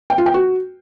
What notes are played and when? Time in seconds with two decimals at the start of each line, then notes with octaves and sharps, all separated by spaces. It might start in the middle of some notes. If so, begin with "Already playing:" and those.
0.10 G5
0.18 F4
0.26 G5
0.34 F#4